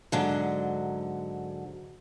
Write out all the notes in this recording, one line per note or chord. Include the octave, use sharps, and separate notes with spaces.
G#2 D3 F#3